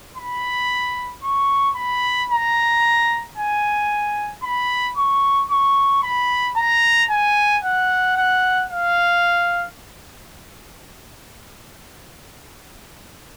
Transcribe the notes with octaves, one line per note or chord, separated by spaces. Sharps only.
B5
C#6
B5
A#5
G#5
B5
C#6
C#6
B5
A#5
G#5
F#5
F#5
F5